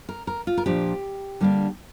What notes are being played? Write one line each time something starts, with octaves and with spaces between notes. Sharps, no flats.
A#4
A#4
F4
A#4
A#2 F3 D4 G4
D3 G3 A#3 D4